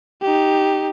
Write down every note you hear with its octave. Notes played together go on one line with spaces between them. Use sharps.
D#4 G4